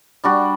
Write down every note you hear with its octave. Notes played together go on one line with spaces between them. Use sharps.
G3 D4 F#4